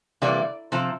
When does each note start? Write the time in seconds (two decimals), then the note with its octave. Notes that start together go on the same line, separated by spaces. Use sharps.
0.22 C3 E3 G3 A#3 D5
0.72 C3 F3 C4